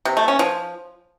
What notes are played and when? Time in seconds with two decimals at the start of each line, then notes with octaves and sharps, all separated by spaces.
0.05 C3
0.17 A3
0.28 C#4
0.39 F3